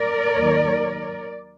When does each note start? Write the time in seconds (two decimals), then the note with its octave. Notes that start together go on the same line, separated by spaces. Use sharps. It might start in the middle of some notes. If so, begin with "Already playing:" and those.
Already playing: A#4 D5
0.38 D#2 D#3 F#3